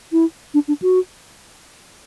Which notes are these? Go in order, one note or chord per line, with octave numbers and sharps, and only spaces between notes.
E4
D4
D4
F#4